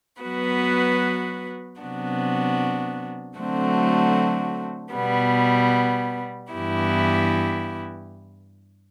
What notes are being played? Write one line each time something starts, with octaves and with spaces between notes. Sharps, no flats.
F#3 B3 F#4 B4
C3 F#3 B3 D4 F#4
D3 F#3 A3 C4 F#4
B2 G3 B3
G2 E3 B3 E4 G4